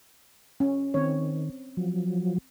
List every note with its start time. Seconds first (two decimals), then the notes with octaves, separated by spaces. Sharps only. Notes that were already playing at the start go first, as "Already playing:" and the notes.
0.60 C#4
0.94 D#3 C4 C#5
1.77 F3 F#3